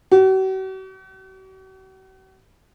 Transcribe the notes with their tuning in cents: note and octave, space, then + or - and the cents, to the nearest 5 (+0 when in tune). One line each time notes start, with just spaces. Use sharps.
F#4 +45